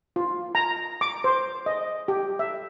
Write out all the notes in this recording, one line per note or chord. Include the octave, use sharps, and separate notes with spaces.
F4
A#5
D6
C5
D#5
G4
E5